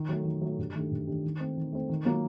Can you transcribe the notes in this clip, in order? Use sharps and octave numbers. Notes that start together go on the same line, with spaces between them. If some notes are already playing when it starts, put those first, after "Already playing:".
Already playing: D#3
F#3 A3
D#3
F#3 A3
G2
D#3 A3 D4 G4
G2
D#3 A3 D4 G4
D#3
A3 C4
D#3
A3 C4
D#3
F#3 A#3